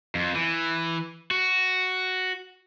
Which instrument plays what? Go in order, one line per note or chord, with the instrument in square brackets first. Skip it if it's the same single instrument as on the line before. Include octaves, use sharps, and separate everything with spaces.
[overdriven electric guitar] F2
E3
F#4